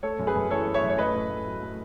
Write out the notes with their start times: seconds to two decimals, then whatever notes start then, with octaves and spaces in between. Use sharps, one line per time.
0.03 A3 A4 C#5
0.19 F#2
0.27 G#4 B4
0.35 F#2
0.51 E3 A4 C#5
0.66 A3
0.74 C#5 E5
0.83 F#2
0.89 C#5
0.98 A3 B4 D#5
1.14 A2
1.30 A2
1.46 F#3
1.61 A3